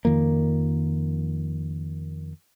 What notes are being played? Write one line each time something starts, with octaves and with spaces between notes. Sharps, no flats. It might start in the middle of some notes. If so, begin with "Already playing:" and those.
F2 D#3 F3 A#3